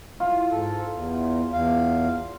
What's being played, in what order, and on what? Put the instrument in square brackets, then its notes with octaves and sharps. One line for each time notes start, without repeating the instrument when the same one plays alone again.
[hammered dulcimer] F4
[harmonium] G#2 A4
E2
E2 F5